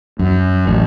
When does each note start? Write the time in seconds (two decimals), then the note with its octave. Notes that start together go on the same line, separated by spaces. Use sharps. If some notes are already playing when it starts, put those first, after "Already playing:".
0.19 F#2
0.67 A1